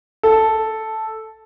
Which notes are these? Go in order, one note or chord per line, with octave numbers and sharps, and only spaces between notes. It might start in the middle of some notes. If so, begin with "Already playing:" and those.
A4